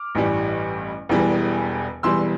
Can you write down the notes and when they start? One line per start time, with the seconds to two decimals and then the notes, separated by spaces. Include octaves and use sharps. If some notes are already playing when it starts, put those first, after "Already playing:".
Already playing: D6 F6
0.15 A1 G2 E3 G3
1.09 E1 E2 E3 G3
2.03 E1 E2 E3 G3 C6 E6